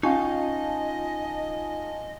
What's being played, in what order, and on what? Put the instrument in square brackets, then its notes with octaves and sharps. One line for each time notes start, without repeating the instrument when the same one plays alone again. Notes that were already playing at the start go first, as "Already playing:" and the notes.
[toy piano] C#4 C#6 [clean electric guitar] D#4 F5 [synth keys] F4 G#5 A5 [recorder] D#5